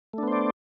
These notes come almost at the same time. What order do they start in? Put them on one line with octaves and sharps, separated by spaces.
A3 D4 B3 C5 D5